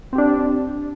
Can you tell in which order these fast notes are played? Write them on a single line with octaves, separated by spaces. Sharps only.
C4 G4 D4